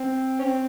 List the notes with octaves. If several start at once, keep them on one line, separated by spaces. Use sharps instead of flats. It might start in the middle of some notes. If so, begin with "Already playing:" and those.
Already playing: C4
C#4
C4